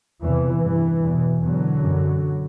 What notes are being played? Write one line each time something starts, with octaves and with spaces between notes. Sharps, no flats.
E2 C3 E3
G2 E3
E2 B2
E2 B2 D3 F#3
F#2